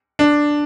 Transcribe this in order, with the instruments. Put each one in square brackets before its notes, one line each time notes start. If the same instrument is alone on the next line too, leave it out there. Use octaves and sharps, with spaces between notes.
[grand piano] D4